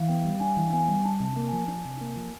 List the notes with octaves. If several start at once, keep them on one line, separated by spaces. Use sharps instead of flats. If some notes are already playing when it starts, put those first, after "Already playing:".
Already playing: E3 F5
B3 G5
G3
D4 G#5
E3
B3 G#5
G3
D4 A5
C3
A5
A#3
F3 G#5
D4
C3
A#3
F3